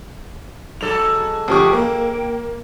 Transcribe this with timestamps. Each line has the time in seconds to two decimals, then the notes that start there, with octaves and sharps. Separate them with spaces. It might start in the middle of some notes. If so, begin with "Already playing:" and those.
0.81 G#2 F#3 A4 E7 F7
1.48 D2 F3 G4 C#6 D#6 F6
1.73 A#3 G5